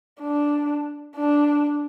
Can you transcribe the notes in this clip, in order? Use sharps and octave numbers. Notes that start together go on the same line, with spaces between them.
D4
D4